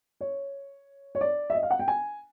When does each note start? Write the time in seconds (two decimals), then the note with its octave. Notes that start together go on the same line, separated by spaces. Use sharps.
0.21 C#5
1.15 C#5
1.21 D5
1.50 E5
1.55 D#5
1.63 F5
1.71 F#5
1.79 G5
1.88 G#5